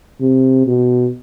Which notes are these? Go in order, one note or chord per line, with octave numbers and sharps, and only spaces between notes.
C3
B2